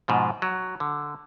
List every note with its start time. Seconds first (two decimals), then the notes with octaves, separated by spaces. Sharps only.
0.08 G#2 B2 F3
0.42 F#3
0.80 D3